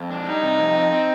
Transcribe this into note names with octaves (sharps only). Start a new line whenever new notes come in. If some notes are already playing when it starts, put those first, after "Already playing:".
Already playing: F2
D4
G3 D#4
C3
F2
C4
C4